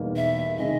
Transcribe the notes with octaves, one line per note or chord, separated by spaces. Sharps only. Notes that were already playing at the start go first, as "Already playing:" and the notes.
Already playing: E2 B2 G3 A#3 D#4
E5
C3 D#3 G#3 D#5